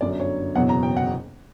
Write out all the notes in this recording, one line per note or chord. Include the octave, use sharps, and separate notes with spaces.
G1 F#2 D3 F#3 D5
C#5
F#1 E2 B2 F#3 F#5
A#5
G5
F#5